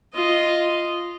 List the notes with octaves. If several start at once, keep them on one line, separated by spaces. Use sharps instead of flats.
F4 D#5